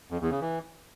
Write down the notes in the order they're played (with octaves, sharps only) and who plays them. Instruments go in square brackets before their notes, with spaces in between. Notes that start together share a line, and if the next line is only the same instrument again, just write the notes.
[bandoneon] F2
E2
C#3
E3